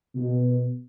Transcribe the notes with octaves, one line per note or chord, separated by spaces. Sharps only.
B2